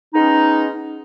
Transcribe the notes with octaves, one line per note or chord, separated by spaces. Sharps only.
G#3 B3 C#4 D#4